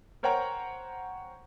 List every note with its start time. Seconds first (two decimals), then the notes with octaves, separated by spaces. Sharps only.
0.23 A#4 C5 C#5 F#5 G5 A#5